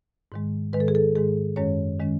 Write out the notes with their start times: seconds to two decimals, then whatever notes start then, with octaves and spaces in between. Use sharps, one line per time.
0.32 G#2 D#3 G#3
0.73 G#2 D#3 G#3 B4
0.80 A4
0.88 G#4
0.95 A4
1.15 G#2 D#3 G#3 G#4
1.56 F#2 D#3 G#3 C#4 C#5
2.00 D#3 G#3 C#4